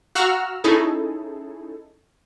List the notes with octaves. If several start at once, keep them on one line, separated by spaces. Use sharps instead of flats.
F#4 F5 F#5 A#5 E6 F6
C#4 D#4 E4 G#4 A4